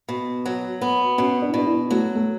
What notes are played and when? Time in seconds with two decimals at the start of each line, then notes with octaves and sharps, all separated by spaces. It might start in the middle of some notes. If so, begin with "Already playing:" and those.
0.08 B2
0.46 F#3
0.81 B3
1.18 B2 C#4
1.42 D4
1.50 E4
1.54 B2 D4
1.66 E4
1.90 F#3 A3
2.15 A3